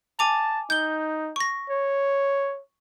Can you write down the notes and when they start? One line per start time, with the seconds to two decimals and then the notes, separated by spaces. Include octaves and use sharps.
0.19 G#5 A5 D6 F7
0.70 D#4 G6 G7
1.36 C#6 A#6
1.70 C#5